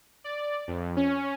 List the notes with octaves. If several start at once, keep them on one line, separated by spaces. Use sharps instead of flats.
D5
F2
C#4